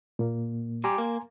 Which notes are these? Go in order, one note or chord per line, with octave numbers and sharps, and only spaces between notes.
A#2 A#3
G3 G4 G#5 A#5 C6
A#3